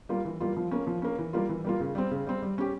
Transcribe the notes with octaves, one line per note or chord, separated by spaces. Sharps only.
G3 A#3 F4
E3
G3 A#3 F4
F3
A#3 C#4
F3
A#3 C#4
E3
G3 A#3 F4
E3
G3 A#3 F4
C#3
G3 C4
C#3
G3 C4
G3
C#4 G4